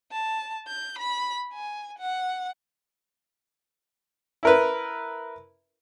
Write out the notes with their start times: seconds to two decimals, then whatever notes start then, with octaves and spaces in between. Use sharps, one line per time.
0.12 A5
0.67 G6
0.99 B5
1.54 G#5
1.99 F#5
4.43 E4 A#4 B4